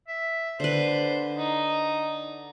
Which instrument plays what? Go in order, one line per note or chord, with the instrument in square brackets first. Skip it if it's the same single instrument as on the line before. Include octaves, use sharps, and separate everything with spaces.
[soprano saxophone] E5
[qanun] D3 B4 [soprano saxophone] C5
[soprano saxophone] D#4